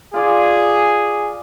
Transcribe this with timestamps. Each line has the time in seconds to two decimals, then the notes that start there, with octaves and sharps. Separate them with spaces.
0.14 F4 G#4 D5 F5